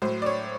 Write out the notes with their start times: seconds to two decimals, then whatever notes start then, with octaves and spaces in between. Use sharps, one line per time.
0.02 A2 F#3 C5
0.22 D5
0.26 C#5